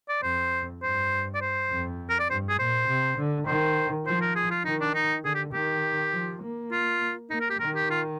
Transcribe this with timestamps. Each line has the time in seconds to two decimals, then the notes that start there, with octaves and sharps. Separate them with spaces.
0.09 D5
0.23 F2 C5
0.82 G2 C5
1.35 D5
1.41 C5
1.70 F2
2.10 A#4
2.19 D5
2.30 G2 C5
2.49 G#4
2.59 A#2 C5
2.88 C3
3.18 D3
3.47 D#3 C5
4.06 F3 C5
4.21 A#4
4.36 G#4
4.51 F4
4.65 D#3 D#4
4.81 D4
4.95 D#4
5.24 D3 G#4
5.35 G4
5.53 D#3 G4
6.13 F3
6.42 A#3
6.71 F4
7.30 A#3 D#4
7.41 A#4
7.50 G4
7.60 D#3 A#4
7.76 G4
7.90 F4